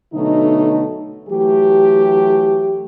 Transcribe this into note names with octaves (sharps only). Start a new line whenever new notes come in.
B2 D3 F#3 A3 D#4
E3 F#3 A3 G4